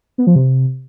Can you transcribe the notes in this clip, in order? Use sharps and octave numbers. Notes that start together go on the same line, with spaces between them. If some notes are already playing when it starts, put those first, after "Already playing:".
B3
F3
C3